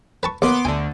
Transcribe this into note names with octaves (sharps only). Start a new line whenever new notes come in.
B4 A5 C#6
D#2 B3 C6 D6
D2 D3 G#5